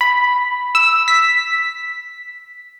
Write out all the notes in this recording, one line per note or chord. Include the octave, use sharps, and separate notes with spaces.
B5
E6
B6